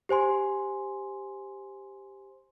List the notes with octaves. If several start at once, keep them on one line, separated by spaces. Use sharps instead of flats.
G4 C5 G#5 C6